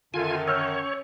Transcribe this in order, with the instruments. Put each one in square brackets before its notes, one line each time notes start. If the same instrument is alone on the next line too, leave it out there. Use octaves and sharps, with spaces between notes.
[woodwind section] F#2 D3 D#3 [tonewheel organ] F4 G#5 [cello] A4
[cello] C#4 [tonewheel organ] C#5 [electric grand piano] E6 F6 G6